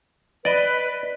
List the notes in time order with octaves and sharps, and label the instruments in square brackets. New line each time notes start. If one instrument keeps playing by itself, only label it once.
[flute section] B4 [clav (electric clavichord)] D5 D#5